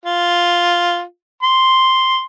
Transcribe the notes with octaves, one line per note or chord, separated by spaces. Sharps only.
F4
C6